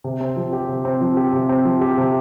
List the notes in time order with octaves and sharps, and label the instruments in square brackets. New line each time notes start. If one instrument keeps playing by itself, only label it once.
[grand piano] C3
C4
F3
G4
C3
C4
F3
G4
C3
C4
F3
G4
C3